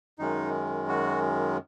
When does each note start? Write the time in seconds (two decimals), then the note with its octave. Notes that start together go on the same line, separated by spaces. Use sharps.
0.19 F#2 D#3 G#3 D#4
0.89 F#4